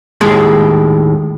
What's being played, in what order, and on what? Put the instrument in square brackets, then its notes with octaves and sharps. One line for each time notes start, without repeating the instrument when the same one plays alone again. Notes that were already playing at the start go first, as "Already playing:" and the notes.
[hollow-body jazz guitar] D#2 A2 G#3 G#4 C6